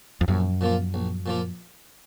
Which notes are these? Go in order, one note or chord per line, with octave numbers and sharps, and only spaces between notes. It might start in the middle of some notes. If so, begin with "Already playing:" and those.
F2
A#1 F#2
A#2 F3 A#3 F4
A#1
A#2 F3 A#3 F4